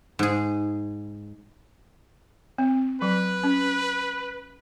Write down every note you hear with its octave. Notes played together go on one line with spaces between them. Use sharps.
G#2 G#4
C4
F#3 B4
C#4